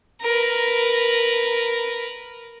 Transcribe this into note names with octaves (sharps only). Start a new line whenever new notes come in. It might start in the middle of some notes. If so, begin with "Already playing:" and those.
A#4 B4